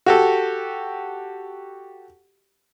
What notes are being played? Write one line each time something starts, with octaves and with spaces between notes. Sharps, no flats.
F#4 G4 A4